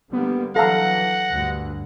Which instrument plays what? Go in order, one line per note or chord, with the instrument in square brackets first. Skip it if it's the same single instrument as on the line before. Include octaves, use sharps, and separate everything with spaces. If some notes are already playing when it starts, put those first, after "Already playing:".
[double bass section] D3 G3 A#3 [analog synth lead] B3
[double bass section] E3 F#3 [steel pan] A4 F5 A#5 [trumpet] F#5 [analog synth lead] A#6
[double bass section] D2 G2